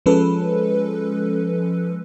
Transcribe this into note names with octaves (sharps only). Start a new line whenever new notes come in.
F3 G#3 C#4 A4 B4